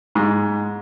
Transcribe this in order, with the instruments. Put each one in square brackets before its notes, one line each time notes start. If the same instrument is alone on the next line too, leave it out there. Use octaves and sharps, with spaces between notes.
[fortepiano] G#2